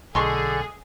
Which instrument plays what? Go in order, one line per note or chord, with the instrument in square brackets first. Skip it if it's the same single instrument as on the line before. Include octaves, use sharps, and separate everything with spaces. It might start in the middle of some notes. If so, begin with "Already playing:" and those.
[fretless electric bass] B1 [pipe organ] D3 A4 [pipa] G#3 C6 C#6 [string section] G#4